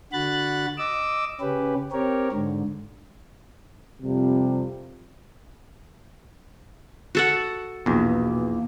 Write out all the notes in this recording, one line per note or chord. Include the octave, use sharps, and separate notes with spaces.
D3 F#4 B5 F#6 A6
D#5 D6 E6
C#3 C#4 G4 B4
C4 G4 A#4 C#5
G#2 D3
F2 C3 F3 G3
F#4 A4 F#5
A#1 E2 B2 A#3